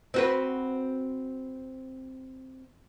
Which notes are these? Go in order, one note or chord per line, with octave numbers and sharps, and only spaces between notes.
C4 F#4 B4